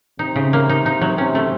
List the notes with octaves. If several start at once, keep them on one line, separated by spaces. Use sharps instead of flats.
C3 D#4
C#3
A#3
D#4
D#4
F#3
C3 C#4
A3